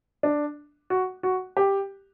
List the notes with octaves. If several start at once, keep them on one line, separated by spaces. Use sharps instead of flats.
D4
F#4
F#4
G4